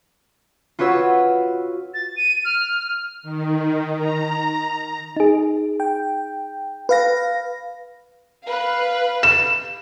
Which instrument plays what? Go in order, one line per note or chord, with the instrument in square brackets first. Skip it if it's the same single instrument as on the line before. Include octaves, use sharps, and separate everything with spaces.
[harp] F4 F#4 B4 C#5 E6
[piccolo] A6
D#7
F6
[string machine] D#3
A#5
[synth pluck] D#4 G#4
[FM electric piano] G5
B4 F5 A#6
[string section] B4 F5
[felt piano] E7